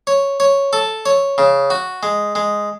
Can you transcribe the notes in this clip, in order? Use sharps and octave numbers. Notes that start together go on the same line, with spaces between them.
C#5
C#5
A4
C#5
C#3
F#4
G#3
G#3